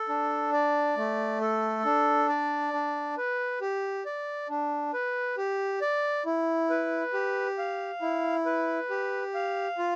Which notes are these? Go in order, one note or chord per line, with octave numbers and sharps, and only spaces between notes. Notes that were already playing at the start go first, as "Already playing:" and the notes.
Already playing: A4
D4
D5
A3
A4
D4
D5
D4
B4
G4
D5
D4
B4
G4
D5
E4
B4
G4
F5
E4
B4
G4
F5
F4